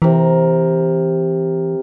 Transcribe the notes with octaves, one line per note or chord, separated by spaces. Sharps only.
C3 E3 A#4